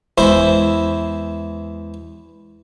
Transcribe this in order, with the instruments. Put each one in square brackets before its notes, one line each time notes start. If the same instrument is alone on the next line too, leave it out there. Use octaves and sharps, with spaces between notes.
[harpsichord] E2 G#3 E4 C5 B5